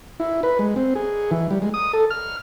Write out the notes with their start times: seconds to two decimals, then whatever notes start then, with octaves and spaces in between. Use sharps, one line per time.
0.20 E4
0.43 B4
0.59 G#3
0.76 C4
0.95 G#4
1.31 E3
1.51 G3
1.62 G#3
1.74 D#6
1.93 A4
2.10 F6